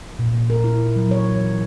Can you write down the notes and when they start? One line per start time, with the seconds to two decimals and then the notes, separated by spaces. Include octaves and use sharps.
0.19 A#2
0.50 A#4
0.64 E4
0.96 F#3
1.11 C#5
1.36 E3